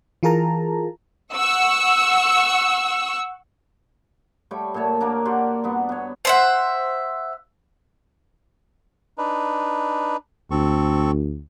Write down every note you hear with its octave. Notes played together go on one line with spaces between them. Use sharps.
E3 F4 G#4 A#4 A5 A#5
F#5 C#6 E6
G3 A3 C#5 G5
A#2 A3 C#5 A5
A#3 D4 A#4
F#4 G4 D5 C6
G2 B3 F#5
B3 C#5
C5 E5 F#5
D4 D#4 B4
D2 C4 A4 C#6